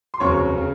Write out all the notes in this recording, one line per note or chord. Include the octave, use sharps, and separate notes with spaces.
C6
F1 D#2 C#3 F#3 C4 C#5 C#6
C#3